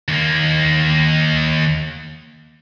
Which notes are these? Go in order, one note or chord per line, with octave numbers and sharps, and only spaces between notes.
D#2 A#3